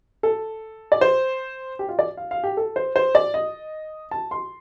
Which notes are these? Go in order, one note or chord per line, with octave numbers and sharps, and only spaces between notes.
A4
D5
C5
G4
F4
D5
F5
F5
G4
A4
C5
C5
D5
D#5
A5
C6